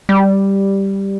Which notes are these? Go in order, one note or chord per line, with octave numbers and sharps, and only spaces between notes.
G3